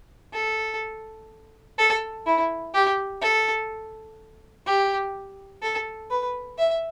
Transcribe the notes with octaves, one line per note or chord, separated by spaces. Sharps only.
A4
A4
E4
G4
A4
G4
A4
B4
E5